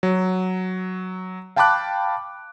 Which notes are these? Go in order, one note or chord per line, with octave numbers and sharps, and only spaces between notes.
F#3
F5 G5 A5 B5 D6 F#6